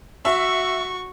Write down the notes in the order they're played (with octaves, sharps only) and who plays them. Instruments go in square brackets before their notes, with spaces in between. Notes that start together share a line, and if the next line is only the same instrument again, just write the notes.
[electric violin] F#4 C#6 [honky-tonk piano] E5